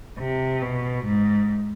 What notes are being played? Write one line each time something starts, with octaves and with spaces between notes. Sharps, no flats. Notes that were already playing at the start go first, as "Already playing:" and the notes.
C3
B2
G#2